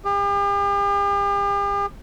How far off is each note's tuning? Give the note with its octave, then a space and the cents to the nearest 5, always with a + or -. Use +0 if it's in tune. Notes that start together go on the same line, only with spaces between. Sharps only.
G4 +45